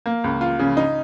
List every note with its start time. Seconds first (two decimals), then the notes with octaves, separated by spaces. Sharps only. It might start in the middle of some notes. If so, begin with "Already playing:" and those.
0.06 A#3
0.24 C#2
0.41 F4
0.59 C#3
0.77 D#4